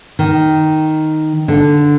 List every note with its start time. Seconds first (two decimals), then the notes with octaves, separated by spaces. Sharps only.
0.19 D#3
1.48 D3